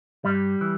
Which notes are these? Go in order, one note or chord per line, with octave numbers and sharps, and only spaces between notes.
G2 G3
E3